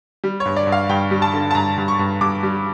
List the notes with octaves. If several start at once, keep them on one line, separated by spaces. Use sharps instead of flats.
G3
C#5
G2
D5
G2
F5
G2 G5
G3
A5
D3
A5
G2 A#5
G2
C#6
G2
G2 D6
G3